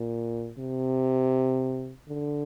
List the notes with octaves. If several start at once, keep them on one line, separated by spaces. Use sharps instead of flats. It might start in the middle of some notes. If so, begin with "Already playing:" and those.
Already playing: A#2
C3
D3